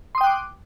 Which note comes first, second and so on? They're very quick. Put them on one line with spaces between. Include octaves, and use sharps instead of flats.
C6 D#6 G5 F#6 D6